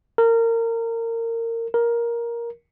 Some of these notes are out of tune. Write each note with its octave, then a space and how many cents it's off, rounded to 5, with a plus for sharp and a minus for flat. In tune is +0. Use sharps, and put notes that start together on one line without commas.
A#4 -25
A#4 +10